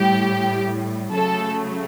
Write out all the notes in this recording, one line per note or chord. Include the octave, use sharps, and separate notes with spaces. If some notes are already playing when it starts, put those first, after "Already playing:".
Already playing: A2 G3 G4
C#3 F#3 A3 A4